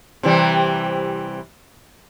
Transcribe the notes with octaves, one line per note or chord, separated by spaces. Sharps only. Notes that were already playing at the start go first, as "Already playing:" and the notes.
C3 E3 G3